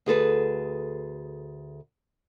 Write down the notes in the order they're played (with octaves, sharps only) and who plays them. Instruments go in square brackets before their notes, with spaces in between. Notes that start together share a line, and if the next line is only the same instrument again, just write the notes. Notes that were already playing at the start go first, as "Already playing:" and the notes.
[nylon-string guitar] D2 G#4 A4 B4